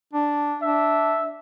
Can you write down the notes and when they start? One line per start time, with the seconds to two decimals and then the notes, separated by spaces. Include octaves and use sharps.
0.13 D4
0.62 D4 E5